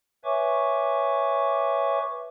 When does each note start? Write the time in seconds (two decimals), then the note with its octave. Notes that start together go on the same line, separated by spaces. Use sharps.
0.24 B4 C#5 E5 G#5 C#6 D6